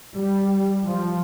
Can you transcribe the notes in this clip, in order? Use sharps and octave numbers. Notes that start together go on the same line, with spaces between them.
G3
F3